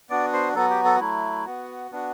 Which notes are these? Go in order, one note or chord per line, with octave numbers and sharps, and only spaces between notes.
B3 D4 F#4 D5
C5
F#3 B3 F#4 A4
G4
A4
F#3 A3 E4
B3 F#4
B3 D4 F#4